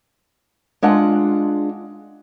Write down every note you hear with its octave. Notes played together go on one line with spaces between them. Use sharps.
G#3 D4 F4 F#5